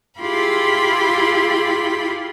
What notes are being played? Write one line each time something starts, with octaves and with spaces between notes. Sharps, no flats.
E4 F4 G4 G#4 B5 C6